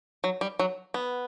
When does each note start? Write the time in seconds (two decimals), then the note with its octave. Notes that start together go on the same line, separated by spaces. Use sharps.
0.24 F#3
0.41 G3
0.59 F#3
0.94 B3